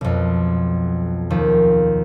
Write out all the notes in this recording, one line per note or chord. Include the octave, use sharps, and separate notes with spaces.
B1 F2
D#2 F3